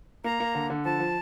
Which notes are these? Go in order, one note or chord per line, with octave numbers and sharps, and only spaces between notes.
A#3 A#5
A#3
D3
D3
F3 A5
F3